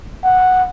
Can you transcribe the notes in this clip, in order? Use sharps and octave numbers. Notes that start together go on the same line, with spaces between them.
F#5